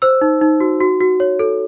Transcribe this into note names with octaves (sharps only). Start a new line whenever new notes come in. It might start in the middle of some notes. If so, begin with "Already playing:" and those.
C5 E6
D#4
D#4
F#4
F#4
F#4
C#5
A4